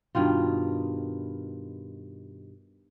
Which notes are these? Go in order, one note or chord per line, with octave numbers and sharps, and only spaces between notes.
G2 B2 D#3 F4